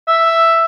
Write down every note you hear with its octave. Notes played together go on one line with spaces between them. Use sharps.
E5